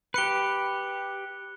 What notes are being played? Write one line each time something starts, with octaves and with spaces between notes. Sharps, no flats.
G4 B4 F#6 C#7 G7